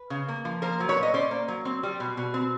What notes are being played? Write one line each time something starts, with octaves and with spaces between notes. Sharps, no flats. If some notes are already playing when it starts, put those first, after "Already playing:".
Already playing: B4
C#3
A#3
F3
A#3 A#4 C5
F#3
B4 C#5
A#2
D#5
C#4 C5 D5
A#3
F#3
C4
G3
B2
B2
C4